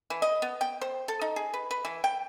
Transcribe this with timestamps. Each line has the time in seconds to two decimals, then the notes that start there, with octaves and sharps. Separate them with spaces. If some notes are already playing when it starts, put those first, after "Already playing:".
0.10 E3
0.22 D#5
0.42 B3
0.61 G5
0.81 C5
1.08 A4
1.21 D#4
1.36 G#4
1.53 B4
1.71 B4
1.85 E3
2.04 G5